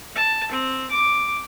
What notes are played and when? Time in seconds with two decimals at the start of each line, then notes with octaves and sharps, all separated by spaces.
0.15 A5
0.52 C4
0.91 D6